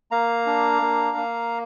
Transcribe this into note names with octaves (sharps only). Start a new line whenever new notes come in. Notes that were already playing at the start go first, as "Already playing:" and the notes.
A#3 F5 A#5
D4
A#3
A#3